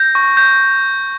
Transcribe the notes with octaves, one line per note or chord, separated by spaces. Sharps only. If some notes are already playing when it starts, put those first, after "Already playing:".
Already playing: G6 A#6
C#6
G6